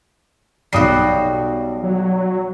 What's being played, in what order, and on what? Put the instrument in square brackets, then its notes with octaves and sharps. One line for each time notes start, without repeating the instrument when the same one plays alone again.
[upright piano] B1 D#6 C7 [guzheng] G3 F#4
[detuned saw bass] F#3